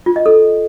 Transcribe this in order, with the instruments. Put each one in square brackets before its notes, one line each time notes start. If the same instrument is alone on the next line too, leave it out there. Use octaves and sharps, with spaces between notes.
[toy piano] F4
D#5
A4